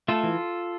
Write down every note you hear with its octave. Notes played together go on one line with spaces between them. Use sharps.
A3 F4 A4
E3